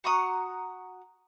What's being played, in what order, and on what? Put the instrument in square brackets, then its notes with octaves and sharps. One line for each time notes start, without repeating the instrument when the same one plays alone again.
[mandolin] F#4 A#5 C#6 D#6